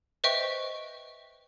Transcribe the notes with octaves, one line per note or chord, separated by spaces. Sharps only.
B4 C5 D#5 E5 G5 C#6